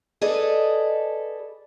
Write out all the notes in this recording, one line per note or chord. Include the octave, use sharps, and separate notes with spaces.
G#4 A4 B4 D5 D#5